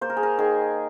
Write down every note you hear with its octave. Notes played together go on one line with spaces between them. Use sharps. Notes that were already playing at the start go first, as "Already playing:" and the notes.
A#3 C5
A#4
G#4
A#4
D#3 G#4